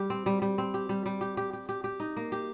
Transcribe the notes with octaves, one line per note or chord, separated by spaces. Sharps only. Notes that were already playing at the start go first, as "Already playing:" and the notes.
Already playing: G3 G4
C4
G3
G3
C4
G4
G3
G3
G4
G4
G4
G4
G4
D#4
A#3
G4